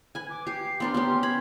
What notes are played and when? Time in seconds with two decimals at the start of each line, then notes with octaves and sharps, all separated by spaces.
0.15 B4 G#5 G#6
0.30 D6
0.47 G4 C7
0.80 B3 D4 A#4 C6
0.94 B3 C#4 G4
1.23 B5 G#6